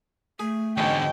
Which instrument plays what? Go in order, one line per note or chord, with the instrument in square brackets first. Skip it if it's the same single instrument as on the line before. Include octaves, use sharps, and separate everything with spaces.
[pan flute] A3 [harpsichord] G#4
[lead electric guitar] E2 D3 [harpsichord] G#2 B2 C#4 [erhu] G5